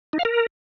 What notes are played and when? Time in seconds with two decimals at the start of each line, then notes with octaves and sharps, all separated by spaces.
0.13 D#4
0.19 F5
0.25 A#4